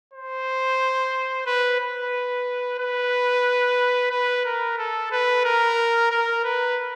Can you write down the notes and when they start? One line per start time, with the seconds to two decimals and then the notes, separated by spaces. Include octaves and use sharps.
0.13 C5
1.46 B4
1.80 B4
2.78 B4
4.11 B4
4.45 A#4
4.78 A4
5.11 B4
5.45 A#4
6.10 A#4
6.44 B4